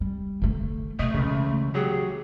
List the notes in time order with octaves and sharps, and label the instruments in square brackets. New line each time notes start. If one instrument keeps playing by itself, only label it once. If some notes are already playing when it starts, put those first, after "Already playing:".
[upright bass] G3
D3 A3
[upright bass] B2 [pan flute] A3 [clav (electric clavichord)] D#5
[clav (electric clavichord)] C#2 C#3 [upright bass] E3
[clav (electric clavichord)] F#3 G4 [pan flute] G#4